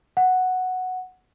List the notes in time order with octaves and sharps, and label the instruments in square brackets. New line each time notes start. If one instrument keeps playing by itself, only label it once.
[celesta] F#5